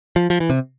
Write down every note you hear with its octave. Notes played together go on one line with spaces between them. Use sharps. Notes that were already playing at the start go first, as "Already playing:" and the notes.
F3
F3
E3
C3